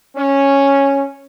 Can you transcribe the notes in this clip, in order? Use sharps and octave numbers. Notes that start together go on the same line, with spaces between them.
C#4